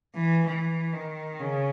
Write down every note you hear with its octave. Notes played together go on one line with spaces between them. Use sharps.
E3
E3
D#3
C#3